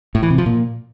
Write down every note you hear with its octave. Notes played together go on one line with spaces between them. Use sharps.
A2
E3
C3
F3
A#2